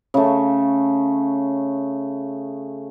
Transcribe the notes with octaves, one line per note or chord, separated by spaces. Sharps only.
C#3 A3